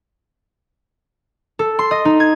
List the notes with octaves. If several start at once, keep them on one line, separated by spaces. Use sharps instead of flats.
A4
C6
D#5
D#4
G#6